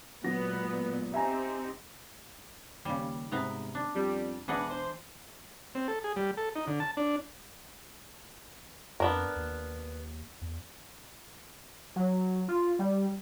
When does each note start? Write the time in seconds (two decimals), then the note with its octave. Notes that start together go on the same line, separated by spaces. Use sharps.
0.24 A#2 F#3 G#3 B3 A#6
1.14 C4 D#4 G4 E5 G#5 A#5
2.85 D#2 C#3 G3
3.32 G#2 C3 B3 A#5
3.75 D4
3.95 F2 G3
4.48 E1 G#2 E3 D4 B4 D#5 F#5
4.69 C5
5.75 C4
5.88 A4
6.04 G#4
6.16 G3
6.37 A4
6.56 D#4
6.67 D3
6.80 A5
6.97 D4
9.00 F2 B3 D4 A#4
9.36 D#2
10.41 E2
11.96 F#3
12.48 F4
12.79 G3